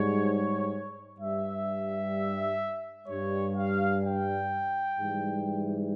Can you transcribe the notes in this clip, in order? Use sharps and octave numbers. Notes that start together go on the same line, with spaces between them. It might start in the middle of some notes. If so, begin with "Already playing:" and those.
Already playing: G#2 G3 C#5
G2 G3 E5
G2 G3 C#5
F5
G5
G#2 E3 G3